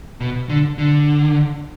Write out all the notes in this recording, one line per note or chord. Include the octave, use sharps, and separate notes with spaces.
B2
D3
D3